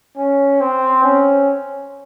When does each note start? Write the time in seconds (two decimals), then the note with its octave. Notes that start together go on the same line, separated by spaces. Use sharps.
0.17 C#4
0.60 C4
1.04 C#4